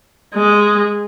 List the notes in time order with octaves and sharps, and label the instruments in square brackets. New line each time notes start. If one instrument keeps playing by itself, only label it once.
[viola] G#3